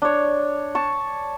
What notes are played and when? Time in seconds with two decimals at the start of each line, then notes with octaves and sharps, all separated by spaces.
0.02 D4 C#5
0.75 A5 C#6